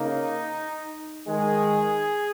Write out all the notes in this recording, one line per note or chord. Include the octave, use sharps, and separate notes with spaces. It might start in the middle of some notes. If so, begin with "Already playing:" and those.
Already playing: C#3 A#3 D#4
D#3 G#3 G#4